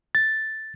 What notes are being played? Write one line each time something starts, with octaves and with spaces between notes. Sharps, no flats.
A6